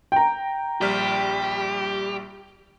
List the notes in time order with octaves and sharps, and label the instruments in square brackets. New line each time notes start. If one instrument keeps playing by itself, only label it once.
[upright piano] G5 A#5
[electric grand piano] A#1 G3 F6 [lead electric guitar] G4